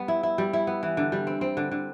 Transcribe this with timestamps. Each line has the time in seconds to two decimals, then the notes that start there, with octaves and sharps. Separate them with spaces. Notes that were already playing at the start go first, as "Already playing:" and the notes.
Already playing: G3 B3
0.08 E4
0.23 E4
0.38 G3
0.53 E4
0.67 B3
0.83 E3
0.97 D3
1.12 G3
1.27 C4
1.41 C4
1.57 D3
1.72 D3